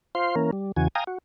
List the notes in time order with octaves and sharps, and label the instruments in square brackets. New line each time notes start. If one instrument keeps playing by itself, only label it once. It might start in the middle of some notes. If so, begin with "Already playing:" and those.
[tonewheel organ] F4 C5 F5 C6
E3 A#3 C#4 A#4
G3
E2 C#3 E3 F#4 G#5
F5 G5 G#5 A#5 D#6
F#4